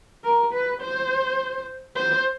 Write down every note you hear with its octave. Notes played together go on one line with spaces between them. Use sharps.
A#4
B4
C5
C5